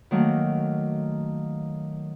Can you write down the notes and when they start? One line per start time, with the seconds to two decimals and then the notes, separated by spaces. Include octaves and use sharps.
0.11 D#3 F#3 A3 A#3